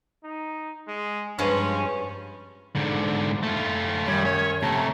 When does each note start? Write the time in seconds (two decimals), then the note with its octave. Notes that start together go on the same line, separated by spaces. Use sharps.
0.23 D#4
0.87 G#3
1.39 G2 F3 G#3 C#4
2.75 G#2 D3
3.43 A3 F4
4.07 F#2 D#3 G3 C#4
4.26 C#5
4.63 C3 A3 C#5 A5 A#5